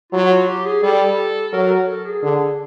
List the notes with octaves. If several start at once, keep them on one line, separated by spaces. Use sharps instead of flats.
F#3 F4
F4
G4
G#4
G3 A4
F#3 A#4
A#4
A4
G#4
D3